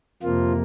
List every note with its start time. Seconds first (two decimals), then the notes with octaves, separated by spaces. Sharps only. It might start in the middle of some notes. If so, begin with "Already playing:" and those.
0.23 F2 C3 F3 A#3 F4